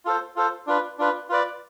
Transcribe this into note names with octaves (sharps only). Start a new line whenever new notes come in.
F4 A4 C5
F4 A4 C5
D4 F4 B4
D4 F4 B4
F4 B4 D5